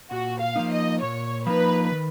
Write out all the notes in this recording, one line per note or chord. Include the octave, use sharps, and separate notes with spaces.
A#2 F#4
F5
F3 A#3 D#4
D#5
A#2 C#5
F3 A#3 D#4 B4
D#3